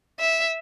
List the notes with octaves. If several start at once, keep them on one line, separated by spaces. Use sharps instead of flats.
E5